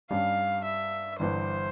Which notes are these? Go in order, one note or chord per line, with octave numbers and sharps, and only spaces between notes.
G2 G3 C#4 F5
E5
G1 G2 E3 C5